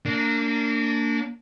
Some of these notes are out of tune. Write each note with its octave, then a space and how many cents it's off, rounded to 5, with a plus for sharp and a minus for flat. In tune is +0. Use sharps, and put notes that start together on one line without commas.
A#3 -25 D4 -15